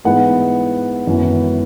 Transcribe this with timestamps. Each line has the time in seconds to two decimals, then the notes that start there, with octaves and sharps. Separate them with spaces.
0.05 G#2 E3 B3 D#4 F#5
1.07 G#1 F#2 E3 B3